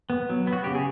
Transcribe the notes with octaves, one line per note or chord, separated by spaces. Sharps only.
B3
F#3
B3
F#4
C#3 G4
G#4